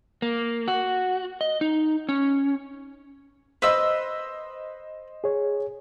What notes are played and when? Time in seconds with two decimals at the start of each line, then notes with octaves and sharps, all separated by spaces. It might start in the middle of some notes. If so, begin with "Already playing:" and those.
0.22 A#3
0.68 F#4
1.41 D#5
1.61 D#4
2.09 C#4
3.62 B4 C5 D#5 E6
5.24 G#4 C#5